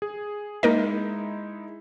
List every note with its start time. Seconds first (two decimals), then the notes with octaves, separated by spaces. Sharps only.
0.02 G#4
0.63 G#3 A#3 D#4 E4 A#4 D#5